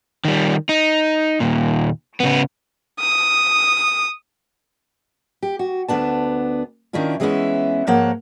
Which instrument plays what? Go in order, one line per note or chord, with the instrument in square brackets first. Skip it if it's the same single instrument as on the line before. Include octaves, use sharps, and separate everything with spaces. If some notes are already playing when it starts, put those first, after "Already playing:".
[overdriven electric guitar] D#3 G3
D#4
D#2 A#2
C#3 B3
[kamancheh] D#6
[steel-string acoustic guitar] G4
F#4
D2 G#2 B3 D4 A5
D#3 C#4 D4 E4 F4
E3 G#3 A#3 B3 C#4 E4
G#2 F3 A#3 C5 C#5 F#5